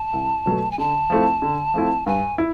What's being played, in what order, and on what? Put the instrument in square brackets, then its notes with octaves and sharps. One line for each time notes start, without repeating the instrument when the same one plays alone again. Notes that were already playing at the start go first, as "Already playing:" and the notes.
Already playing: [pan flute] A5
[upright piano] C2
B2 F#3 A3
[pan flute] G#5
[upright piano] D3 [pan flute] A5
[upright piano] F3 A3 C4 E4
D3
F3 A3 C4 E4
[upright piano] G2 [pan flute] G#5
[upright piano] E4